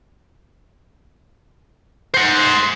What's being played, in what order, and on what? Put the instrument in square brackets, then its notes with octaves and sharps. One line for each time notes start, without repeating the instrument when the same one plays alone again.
[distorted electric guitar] C5 F#5